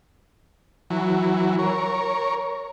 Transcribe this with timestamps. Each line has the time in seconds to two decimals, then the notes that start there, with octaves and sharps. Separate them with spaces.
0.90 E3 F#3
1.59 A#4 C#5